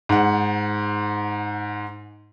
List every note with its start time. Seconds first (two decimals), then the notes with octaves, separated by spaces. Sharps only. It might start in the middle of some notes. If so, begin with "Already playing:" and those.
0.09 G#2 F#5